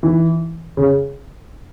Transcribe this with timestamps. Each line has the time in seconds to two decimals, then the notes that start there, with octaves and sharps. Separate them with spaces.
0.03 E3
0.77 C#3